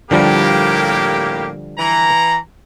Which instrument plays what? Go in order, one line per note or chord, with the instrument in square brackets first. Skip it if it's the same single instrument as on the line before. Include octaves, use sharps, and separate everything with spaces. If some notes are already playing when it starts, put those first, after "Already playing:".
[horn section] A2 A#3 G4 [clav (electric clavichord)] D3 F3 G3
[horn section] E3 A#5